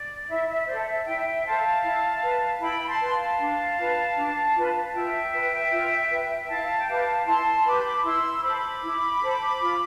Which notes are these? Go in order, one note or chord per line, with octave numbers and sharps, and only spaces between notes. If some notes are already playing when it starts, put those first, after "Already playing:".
Already playing: D5
E4 E5
E5
A4 C5 D5
E5
E4 E5 G5
A4 C5 F5 A5
E4
B4
E4 G5 B5
A5 C6
B4
F5 A5
D4
F4 B4
D4
F4 B4
F4 E5 G5
B4
F4
B4
E4 F5 A5
F5
G5
G4 B4 F5 A5
E4 A5 C6
G4 B4 B5 D6
E4 C6 E6
A4 C5 B5 D6
E4
A4 C5
F4